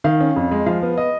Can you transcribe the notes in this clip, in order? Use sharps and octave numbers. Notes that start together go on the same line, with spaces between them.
D#3 F5
C#4
F2
G#3
F3 F5
B3
D#5